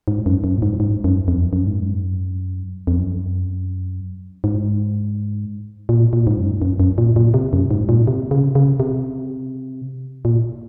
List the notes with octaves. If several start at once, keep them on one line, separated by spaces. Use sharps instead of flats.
G#2
F#2
F#2
A#2
G#2
G#2
F#2
F2
F#2
G#2
F#2
F2
F#2
G#2
A#2
A#2
G#2
F#2
F#2
F#2
A#2
A#2
C3
F#2
G#2
A#2
C3
C#3
C#3
C3
A#2